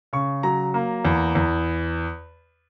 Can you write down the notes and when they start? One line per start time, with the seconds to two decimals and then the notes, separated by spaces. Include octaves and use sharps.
0.13 C#3 C#6
0.43 F#3 A#5
0.74 A#3
1.05 E2
1.35 E2